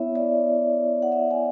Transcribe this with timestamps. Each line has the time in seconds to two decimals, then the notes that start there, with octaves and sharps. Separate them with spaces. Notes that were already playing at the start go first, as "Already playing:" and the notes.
Already playing: B3 E4 C#5 E5
0.15 D5
1.02 F#5
1.12 E5
1.31 G#5